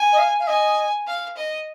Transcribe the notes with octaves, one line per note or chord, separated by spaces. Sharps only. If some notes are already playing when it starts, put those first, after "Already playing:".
Already playing: G#5
D#5
F5
F5
D#5 G#5
F5
D#5